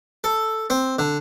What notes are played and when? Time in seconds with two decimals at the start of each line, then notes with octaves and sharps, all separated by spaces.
0.24 A4
0.70 C4
0.99 D3